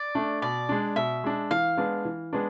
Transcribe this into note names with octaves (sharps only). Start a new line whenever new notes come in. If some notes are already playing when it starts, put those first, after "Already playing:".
Already playing: D5
A3 D4
B2 D5
G#3 D4
B2 E5
G#3 D4
E3 F5
G#3 B3 D4
E3
G#3 B3 D4